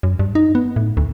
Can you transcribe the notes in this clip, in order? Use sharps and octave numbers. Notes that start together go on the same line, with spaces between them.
F#2
G2
D#4
B3
A2
D2